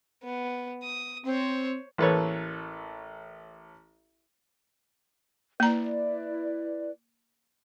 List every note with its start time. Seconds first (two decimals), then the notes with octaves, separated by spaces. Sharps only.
0.23 B3
0.83 D#6
1.26 C4 C5 C#5
1.98 A1 A#3 A4 B4 C#5
5.60 A#3 E4 B4 D5 A#5